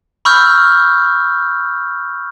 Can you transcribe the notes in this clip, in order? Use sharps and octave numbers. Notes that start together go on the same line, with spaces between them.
B5 C#6 E6 F6 G6